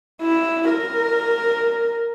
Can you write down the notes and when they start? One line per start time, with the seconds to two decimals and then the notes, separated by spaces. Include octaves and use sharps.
0.22 E4
0.69 A#4